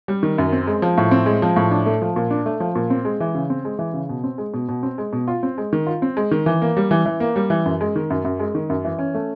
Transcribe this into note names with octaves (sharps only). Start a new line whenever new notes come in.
G3
D#3
F#2
C4
G#3
F3
A2
C4
G#3
F3
A2
D4
A3
F3
A#2
D4
A3
F3
A#2
C4
G#3
E3
C#3
C4
G#3
E3
C#3
B2
C4
G#3
B2
B2
C4
G#3
B2
F4
C4
G#3
D#3
F4
C4
G#3
D#3
E3
A#3
G3
E3
E3
A#3
G3
E3
F#2
G#3
D#3
F#2
F#2
G#3
D#3
F#2
E3
C#4
A3